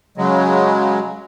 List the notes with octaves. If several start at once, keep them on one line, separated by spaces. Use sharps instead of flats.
C#3 F#3 G#3